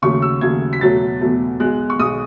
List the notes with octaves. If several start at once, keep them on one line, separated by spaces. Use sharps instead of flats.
D#2 C#3 F#3 A3 C#6
E6
D#2 C#3 F#3 A3 G#6
B6
E2 B2 F#3 A3 A6
E2 B2 F#3 A3
B1 B2 G#3 F#6
C#6
B1 B2 G#3 D#6